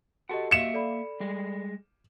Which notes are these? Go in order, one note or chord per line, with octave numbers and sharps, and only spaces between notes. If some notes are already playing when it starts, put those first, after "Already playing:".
F#4 G4 A4 D#5 F#5
A#3 E5 F5 C#7 E7
A4 D5 B5
G3 G#3